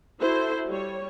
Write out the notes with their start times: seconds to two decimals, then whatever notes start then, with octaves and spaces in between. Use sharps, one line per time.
0.20 E4 F#4 A4 C5
0.68 G3 C#5